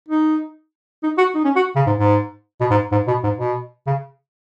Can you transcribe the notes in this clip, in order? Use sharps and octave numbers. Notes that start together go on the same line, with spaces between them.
D#4
D#4
F#4
D#4
C#4
F#4
C#3
G#2
G#2
B2
G#2
G#2
B2
G#2
B2
C#3